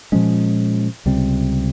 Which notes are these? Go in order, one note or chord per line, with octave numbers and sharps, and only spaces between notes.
A#2 F3 G#3 C#4
C#2 C3 G3 C4